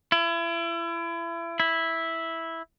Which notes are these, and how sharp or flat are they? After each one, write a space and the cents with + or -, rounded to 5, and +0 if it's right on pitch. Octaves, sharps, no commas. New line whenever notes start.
E4 +35
E4 -5